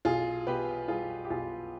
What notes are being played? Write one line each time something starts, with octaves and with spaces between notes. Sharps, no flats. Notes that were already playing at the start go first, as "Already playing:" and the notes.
B1 F4 G#4
B2 G4 B4
G3 F4 G#4
G4
B1 F4 G#4